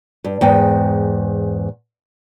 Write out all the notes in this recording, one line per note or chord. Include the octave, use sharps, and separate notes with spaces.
G2
E2 G#2 G5